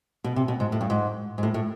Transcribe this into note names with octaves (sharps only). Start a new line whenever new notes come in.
B2
C3
B2
G#2
A2
G2
G#2
G#2
A2
A2